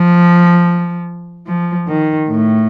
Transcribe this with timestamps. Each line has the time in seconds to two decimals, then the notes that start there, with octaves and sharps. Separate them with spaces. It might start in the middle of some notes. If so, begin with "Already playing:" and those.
Already playing: F3
1.47 F3
1.88 D#3
2.29 A2